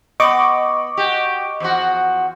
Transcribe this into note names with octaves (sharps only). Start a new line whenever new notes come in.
B3 D#5 C#6 D6
F#4 G4
E2 F3 F#4